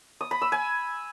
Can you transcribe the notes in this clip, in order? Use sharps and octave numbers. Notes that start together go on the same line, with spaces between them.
D#6
B5
E6
G#5